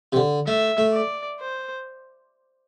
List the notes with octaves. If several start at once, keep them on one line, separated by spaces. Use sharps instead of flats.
C3
D3
A3 E5
A3
D5
C5